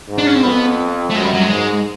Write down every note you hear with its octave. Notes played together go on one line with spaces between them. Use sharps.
G#2
D4
C#4
C4
F2 B3
A3
F#2 G#3
G3
F#3
G#3
G#2